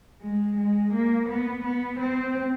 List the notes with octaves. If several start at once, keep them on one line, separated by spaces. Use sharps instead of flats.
G#3
G#3
A#3
B3
B3
C4